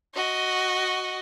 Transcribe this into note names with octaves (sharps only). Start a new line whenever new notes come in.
F#4 D#5